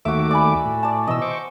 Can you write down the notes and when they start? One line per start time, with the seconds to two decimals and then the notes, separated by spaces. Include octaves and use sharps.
0.05 D#2 A3 F#4 E5 D6
0.31 D5 G#5 B5
0.65 A2
0.83 D5 A5
1.07 B2 E3 D#5 E6
1.22 C5 C#6 D6